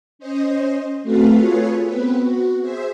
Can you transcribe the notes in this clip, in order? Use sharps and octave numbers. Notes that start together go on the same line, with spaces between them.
C#4 C5 D#5
A3 C4 F#4 A4 B4 F5
F4 G#4 A4 B4 C#5
B3 C4 B4
F#4
G#4 C5 E5